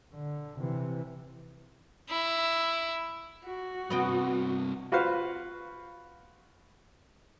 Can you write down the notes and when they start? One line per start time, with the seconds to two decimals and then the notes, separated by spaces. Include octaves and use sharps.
0.14 D3
0.60 C3 E3
2.09 E4
3.46 F#4
3.90 G2 C3 B3 D#5 G5
4.92 F4 F#4 B4 C5 F5